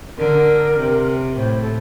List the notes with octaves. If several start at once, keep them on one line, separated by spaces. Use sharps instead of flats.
D3 A#4
C3
A2 C5
A4